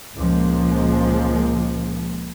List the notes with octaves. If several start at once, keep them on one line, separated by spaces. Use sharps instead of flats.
C#2 A#2 F3 G#3 A#3